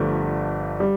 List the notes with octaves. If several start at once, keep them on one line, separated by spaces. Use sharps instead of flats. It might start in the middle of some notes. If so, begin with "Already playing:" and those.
Already playing: G1 G2 F3 A3
G3